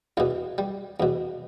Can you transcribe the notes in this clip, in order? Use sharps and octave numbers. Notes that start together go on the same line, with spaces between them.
E2 B2 E3
G3
E2 B2